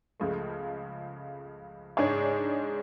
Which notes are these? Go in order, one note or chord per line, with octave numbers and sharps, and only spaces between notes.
C#2 C#3 F3 A3
G#2 G#3 D4 G#4 C#5